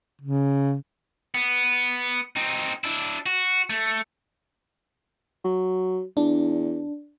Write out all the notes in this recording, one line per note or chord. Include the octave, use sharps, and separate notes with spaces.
C#3
B3
C4 D#4
D4 E4
F#4
A3
F#3
E2 D4